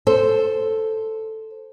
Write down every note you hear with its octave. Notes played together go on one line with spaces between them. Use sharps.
A4 C5